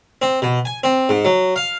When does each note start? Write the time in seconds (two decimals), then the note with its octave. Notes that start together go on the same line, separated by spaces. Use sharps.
0.22 C4
0.42 B2
0.65 G#5
0.84 C4
1.09 G#2
1.25 F#3
1.56 F5